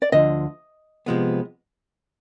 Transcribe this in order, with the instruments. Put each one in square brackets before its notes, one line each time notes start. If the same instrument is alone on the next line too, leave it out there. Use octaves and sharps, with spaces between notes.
[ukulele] D5
[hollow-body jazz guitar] D2 D3 F3 [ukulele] D#5
[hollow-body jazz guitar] C3 F3 G#3 B3